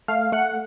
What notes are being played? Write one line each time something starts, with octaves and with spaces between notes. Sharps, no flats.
A3 F5
A3 F#5